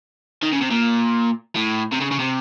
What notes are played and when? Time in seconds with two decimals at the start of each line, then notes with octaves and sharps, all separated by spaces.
0.43 D#3
0.53 C#3
0.61 C3
0.71 A#2
1.56 A2
1.93 C3
2.01 C#3
2.12 C#3
2.20 C3